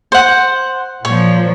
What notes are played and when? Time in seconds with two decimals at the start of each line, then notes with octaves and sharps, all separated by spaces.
0.12 C5 F#5
1.05 A#2 F3 C#5